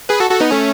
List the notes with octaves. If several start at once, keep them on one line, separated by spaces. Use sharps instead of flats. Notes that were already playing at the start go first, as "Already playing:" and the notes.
G#4 B4
F#4 A4
F#4 A4
B3 D#4
A3 C#4